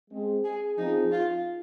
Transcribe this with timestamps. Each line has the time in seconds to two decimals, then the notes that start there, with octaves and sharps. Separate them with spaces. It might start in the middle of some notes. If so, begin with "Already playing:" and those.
0.11 G#3 C4 G#4
0.44 G#4
0.78 F3 C4 D#4 G#4
1.12 F4